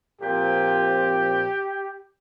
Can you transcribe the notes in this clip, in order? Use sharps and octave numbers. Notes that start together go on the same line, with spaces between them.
A#2 F3 C4 G4